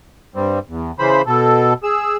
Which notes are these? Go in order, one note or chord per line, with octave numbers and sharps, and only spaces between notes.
G2 G3 C4
E2
C#3 E3 C5 B5
B2 A4
G#4 E6